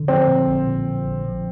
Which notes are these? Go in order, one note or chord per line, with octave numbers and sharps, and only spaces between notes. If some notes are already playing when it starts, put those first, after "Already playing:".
Already playing: D3
F3 C4
A#2
A#1
A#2
A#2
A#1
F3